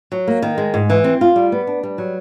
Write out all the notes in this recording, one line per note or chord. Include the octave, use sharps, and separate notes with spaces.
F#3
A#3
D#3
G#3
G#2
E3
C4
F4
G3
B3
D4
G3
F#3